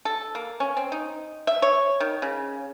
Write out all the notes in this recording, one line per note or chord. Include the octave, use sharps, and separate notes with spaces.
A4
A#3
C#4
C4
D#4
E5
C#5
D#3
C#3